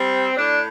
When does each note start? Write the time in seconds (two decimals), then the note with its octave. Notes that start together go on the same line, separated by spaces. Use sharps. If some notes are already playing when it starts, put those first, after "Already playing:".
Already playing: G3 C4
0.36 A2 D4